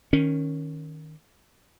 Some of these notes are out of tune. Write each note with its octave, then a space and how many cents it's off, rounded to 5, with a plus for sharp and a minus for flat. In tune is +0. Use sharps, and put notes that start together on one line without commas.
D#3 +0 C#4 +0